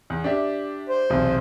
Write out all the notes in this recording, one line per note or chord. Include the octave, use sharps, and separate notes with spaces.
E2
D4 G4 E5
C5
B1 E2 C3